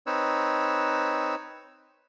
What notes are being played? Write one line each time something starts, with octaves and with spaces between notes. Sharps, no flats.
C4 D#4 B4 C#5 E6